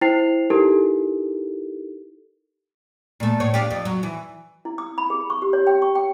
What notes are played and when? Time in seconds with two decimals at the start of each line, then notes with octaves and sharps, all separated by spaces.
0.01 E4 C5 G5 C7 F7
0.50 D#4 E4 G4 A4 A#4
3.20 A#2 A3
3.40 A2 C#5
3.54 D4 F4 G4
3.71 F2
3.85 F#3
4.03 E3
4.65 E4
4.78 D#6
4.98 B5
5.10 G#4
5.30 C#6
5.42 G4
5.53 C#5
5.67 G5
5.82 C#6
5.95 G5